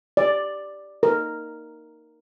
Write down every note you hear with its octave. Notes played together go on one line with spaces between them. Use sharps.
D5
A#4